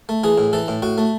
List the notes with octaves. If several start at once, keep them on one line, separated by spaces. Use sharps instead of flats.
A3
E3 G#4
A2
E3 A4
A2
A2 F#4
A3